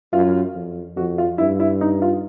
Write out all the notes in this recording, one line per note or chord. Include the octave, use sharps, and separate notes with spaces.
F#2 F4
F2
F2 F#4
F4
G2 E4
E4
D#4
F4